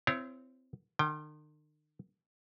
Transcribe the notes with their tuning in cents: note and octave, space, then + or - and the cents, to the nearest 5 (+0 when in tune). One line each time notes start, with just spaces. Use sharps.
C4 -20 E4 +30 C#5 +0
D#3 -45 G5 +15